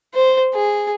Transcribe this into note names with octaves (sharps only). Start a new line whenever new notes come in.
C5
G#4